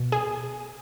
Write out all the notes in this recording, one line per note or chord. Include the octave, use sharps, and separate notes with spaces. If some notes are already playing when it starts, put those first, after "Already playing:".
Already playing: B2
G#4